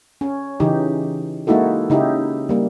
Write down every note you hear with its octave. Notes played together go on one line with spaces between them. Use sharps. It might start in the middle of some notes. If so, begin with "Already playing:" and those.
C#4
C#3 E3 D#4 G4
G#3 A#3 D#4 E4 F#4 A4
C#3 D#4 E4 G4
G3 A#3